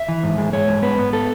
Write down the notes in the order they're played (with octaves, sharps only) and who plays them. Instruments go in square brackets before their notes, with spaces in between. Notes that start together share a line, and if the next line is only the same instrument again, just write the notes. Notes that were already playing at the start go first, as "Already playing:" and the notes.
Already playing: [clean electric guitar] E5
E3
G#2
G#3
G#3 C#5
G#2
B3 B4
B3
A4